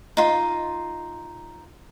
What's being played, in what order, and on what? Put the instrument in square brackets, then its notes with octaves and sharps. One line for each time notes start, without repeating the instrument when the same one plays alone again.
[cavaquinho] D#4 F4